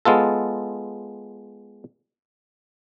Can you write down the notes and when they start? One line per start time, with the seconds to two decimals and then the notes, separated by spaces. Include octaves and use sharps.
0.05 G#3 B3 F4 A4